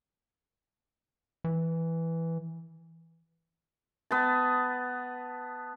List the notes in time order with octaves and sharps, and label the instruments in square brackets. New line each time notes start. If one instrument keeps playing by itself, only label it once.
[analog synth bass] E3
[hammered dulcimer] B3 A5